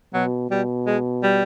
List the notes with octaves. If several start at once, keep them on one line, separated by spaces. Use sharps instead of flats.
B2 F#3
B2 G3
G#3
G3